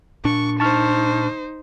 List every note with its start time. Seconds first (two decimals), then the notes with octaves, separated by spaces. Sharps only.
0.25 A#2 D4 C#6
0.60 D#4 C5 A5 C#6 F6